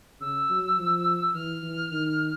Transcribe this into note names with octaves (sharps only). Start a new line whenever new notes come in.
C#3 E6
F#3
F3
E3 F6
E3
D#3